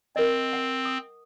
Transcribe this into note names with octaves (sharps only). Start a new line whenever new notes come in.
C4 A#4 D#5
F#5
D#6